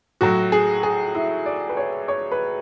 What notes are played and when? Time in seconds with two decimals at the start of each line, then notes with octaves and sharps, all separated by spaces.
0.21 A2 F#3 F#4
0.52 G#4
0.83 G#4
1.15 E4
1.46 D5
1.69 B4
1.77 C#5
2.08 C#5
2.32 B4